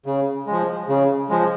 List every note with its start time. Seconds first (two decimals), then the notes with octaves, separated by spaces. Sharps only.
0.06 C#3
0.47 G#3
0.52 F3
0.89 C#3
1.29 F3 G#3